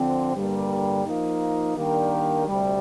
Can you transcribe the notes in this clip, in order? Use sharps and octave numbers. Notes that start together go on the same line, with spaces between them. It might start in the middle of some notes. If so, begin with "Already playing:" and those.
Already playing: D3 F3 C4
G2 D3 G3 A#3
F3 A#3 D#4
D#3 G3 A#3 D4 G4
D2 C3 G3